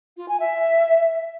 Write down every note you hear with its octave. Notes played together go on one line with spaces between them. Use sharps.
F4
G#5
E5